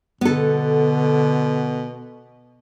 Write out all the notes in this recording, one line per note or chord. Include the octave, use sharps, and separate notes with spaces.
B2 D3 B3 A4